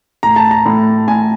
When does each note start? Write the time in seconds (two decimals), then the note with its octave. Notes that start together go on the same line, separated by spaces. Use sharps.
0.23 A2 A#5
0.36 A5
0.51 A#5
0.66 A2
1.08 A2 G#5